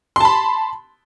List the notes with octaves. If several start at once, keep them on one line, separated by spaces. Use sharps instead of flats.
A5 B5 C6